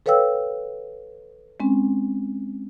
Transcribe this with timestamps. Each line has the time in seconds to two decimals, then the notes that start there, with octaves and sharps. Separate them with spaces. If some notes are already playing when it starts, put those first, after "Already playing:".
0.06 A4 B4 C#5 F5 G5 E6
1.60 G#3 C4 C#4